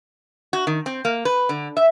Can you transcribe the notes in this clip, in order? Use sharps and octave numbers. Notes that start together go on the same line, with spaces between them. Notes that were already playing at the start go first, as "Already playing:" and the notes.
F#4
D#3
C4
A#3
B4
D3
E5